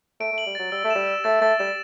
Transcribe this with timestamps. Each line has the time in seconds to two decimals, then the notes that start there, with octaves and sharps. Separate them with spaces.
0.20 A3 D7
0.33 A3
0.38 F#7
0.47 G3
0.55 F#3 A6
0.72 G3 E6
0.84 A3
0.90 G3 E7
1.07 E6
1.24 A3 A6
1.41 A3 A6
1.59 G3 E7